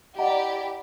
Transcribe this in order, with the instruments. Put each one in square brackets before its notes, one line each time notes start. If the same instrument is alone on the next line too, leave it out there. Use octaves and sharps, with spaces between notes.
[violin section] E4 G4 D5 [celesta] D#5 F#5 A#5